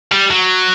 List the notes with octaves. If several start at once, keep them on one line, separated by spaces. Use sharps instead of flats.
G3
F#3